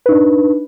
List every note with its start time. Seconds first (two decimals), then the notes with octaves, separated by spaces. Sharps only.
0.06 B4
0.09 D#4
0.12 D4